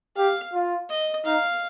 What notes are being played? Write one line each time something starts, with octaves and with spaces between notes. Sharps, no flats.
G4 F5
F4
D#5
D#4 F5